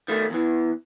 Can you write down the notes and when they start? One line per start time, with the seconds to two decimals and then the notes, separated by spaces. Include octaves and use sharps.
0.08 D#3 A3
0.30 E2 E3